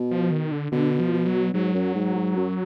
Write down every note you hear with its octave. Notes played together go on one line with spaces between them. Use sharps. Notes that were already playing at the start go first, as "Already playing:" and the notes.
Already playing: B2
F3
D#3
D3
B2 D3
F3
B2
F#3
G#2 F#3
F#2
G#2
G#2
F#2